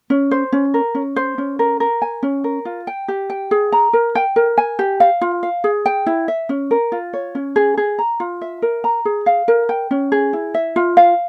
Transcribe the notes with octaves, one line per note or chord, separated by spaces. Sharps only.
C#4
C5
C#4
A#4
C#4
C5
C#4
A#4
A#4
G#5
C#4
A#4
F4
G5
G4
G5
G#4
A#5
A#4
G5
A#4
G#5
G4
F5
F4
F5
G#4
G5
E4
E5
C#4
A#4
F4
C#5
C#4
G#4
G#4
A#5
F4
E5
A#4
A#5
G#4
F5
A#4
G5
C#4
G#4
E4
E5
F4
F5